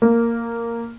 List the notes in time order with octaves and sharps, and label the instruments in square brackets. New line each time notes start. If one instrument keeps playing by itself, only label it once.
[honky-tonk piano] A#3